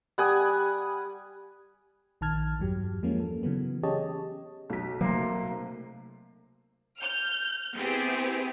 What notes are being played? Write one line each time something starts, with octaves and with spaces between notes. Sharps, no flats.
G3 F#5 G#5 D#6
A#1 D#3 A5 F6 G#6
E2 G2 F#3 G4
F3 G#3 A#3 C#4
A4
C#3 E3 F#3 B3
C#4 G4 G#4 C#5 D#5 A5
B1 B6
C3 F#3 A3 A#3 C6
F6 G6
B3 C4 E4 G4 G#4